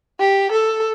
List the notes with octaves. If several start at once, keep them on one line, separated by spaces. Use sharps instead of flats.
G4
A4